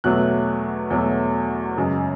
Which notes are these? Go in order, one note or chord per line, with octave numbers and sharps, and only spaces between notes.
E2 B2 F#3 A3 F#6
E2 B2 F#3 A3
F#2 C#3 G#3